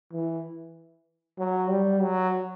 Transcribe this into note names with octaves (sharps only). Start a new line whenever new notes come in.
E3
F#3
G3
F#3